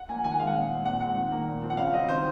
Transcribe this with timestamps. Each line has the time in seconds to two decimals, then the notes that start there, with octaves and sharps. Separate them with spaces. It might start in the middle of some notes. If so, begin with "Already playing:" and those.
Already playing: F#5
0.09 F3 A#3 G#5
0.24 D#3 G#5
0.31 F#5
0.39 G#3 C4 F5
0.47 F#5
0.55 A#2
0.70 G#3 C4
0.85 A#2 F#5
1.00 G#3 C4 F#5
1.16 D#3
1.32 A#3
1.48 A#2
1.62 F3 C4
1.70 F#5
1.77 C#3 F5
1.93 F#3 C4 D#5
2.09 D#3 C5